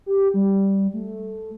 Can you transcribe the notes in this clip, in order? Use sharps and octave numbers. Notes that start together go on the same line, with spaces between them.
G4
G3
A3